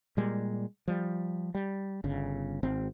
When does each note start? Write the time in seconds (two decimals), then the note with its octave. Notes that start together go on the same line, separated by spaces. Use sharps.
0.17 A#2 G3 G#3
0.88 F3 G3
1.55 G3
2.04 G1 C#3
2.63 G#1 C4